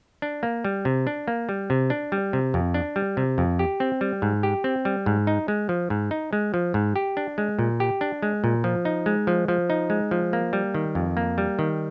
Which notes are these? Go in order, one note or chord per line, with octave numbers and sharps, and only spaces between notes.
D4
A#3
G3
C3
D4
A#3
G3
C3
D4
G3
C3
F2
D4
G3
C3
F2
G4
C4
G3
G#2
G4
C4
G3
G#2
D#4
G#3
F3
G#2
D#4
G#3
F3
G#2
G4
D4
G#3
A#2
G4
D4
G#3
A#2
F3
D#4
G#3
F3
F3
D#4
G#3
F3
A#3
G3
D#3
F2
A#3
G3
D#3